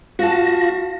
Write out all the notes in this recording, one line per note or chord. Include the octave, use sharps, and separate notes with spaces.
F4 F#4 F5 A5 A#6